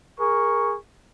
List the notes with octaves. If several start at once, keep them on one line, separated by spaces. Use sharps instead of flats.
G#4 A#4 C#6